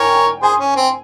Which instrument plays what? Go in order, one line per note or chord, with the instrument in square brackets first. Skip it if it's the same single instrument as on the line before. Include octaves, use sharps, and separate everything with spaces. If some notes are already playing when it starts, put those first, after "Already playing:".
Already playing: [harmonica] A#4 C#5 [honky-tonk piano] G5 G#5
[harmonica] G#4 C5 [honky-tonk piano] G#5
[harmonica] C#4
C4